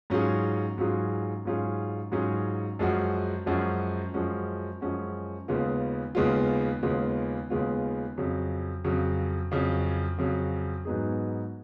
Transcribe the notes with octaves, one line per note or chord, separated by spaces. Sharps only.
G#2 F#3 C#4 F4 G#4
G#2 F#3 C#4 F4 G#4
G#2 F#3 C#4 F4 G#4
G#2 F#3 C#4 F4 G#4
F#2 F3 G#3 C#4 F#4
F#2 F3 G#3 C#4 F#4
F#2 F3 G#3 C#4 F#4
F#2 F3 G#3 C#4 F#4
D#2 C#3 G#3 B3 F4
D#2 C#3 G#3 B3 F4
D#2 C#3 G#3 B3 F4
D#2 C#3 G#3 B3 F4
F2 C#3 F#3
F2 C#3 F#3
F2 C#3 F#3
F2 C#3 F#3
G#2 F#3 B3 D#4 G#4